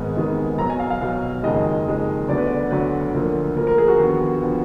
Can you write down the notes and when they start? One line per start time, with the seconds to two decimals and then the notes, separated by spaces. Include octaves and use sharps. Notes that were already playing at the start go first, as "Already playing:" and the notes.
Already playing: G#1 G#2 D#3 G#3 B3 G#5
0.16 G#1 G#2 D#3 G#3 B3
0.58 B1 B2 F#3 A#5
0.70 G#5
0.80 F5
0.90 F5
1.01 B1 B2 F#3 F5
1.43 F#1 F2 D#3 G#3 D#5
1.86 F#1 F2 D#3 G#3
2.28 D2 D3 F#3 B3 D5
2.38 B4
2.47 D5
2.71 D2 D3 F#3 B3 B4
3.14 D2 D3 F3 A#3
3.56 D2 D3 F3 A#3 A#4
3.67 A#4
3.78 G#4
3.88 F#4
3.99 D#2 D3 F3 B3 F#4
4.41 D3 F3 B3